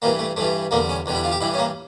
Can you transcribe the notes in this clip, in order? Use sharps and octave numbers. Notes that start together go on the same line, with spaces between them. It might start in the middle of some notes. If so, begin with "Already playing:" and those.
G2 E3 G3 A#3
A3
G2 E3 G3 A3
E2 D3 G3 A#3
C#4
E2 D3 G3
E4
F4
G4
G2 E3 G3 E4
C#4
A#3